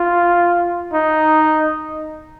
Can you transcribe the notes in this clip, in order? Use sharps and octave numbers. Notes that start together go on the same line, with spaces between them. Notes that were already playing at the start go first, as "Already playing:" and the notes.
Already playing: F4
D#4